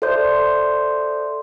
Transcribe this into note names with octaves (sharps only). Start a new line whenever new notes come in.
A4 C5 D5 E5 C6 G6